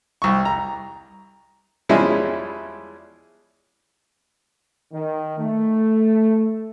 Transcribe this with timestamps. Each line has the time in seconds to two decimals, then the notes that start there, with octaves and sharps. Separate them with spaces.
0.22 C2 C#6
0.45 A#5
1.89 E2 F3 G3 G#3 C#4 E4
4.93 D#3
5.38 A3